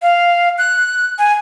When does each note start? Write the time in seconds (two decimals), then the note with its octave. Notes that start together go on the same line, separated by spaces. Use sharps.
0.02 F5
0.58 F#6
1.19 G#5